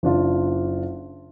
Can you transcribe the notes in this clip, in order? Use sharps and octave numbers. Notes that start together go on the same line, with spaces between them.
F#1 D4 F4